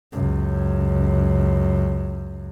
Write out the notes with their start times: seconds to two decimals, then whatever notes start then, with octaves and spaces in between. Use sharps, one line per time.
0.13 C#2 F#2